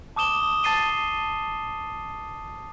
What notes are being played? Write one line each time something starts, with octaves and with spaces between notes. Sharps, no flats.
A5 D6 D#6 E7 G7
A5 A6 C7 D#7 G7